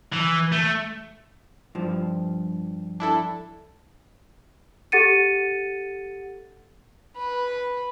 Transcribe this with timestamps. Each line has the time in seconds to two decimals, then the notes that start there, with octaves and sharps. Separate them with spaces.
0.13 E3
0.53 A3
1.75 G2 F3
3.00 D4 E4 A4
4.92 G4 A4 F#5 A6 C#7 D#7
7.16 B4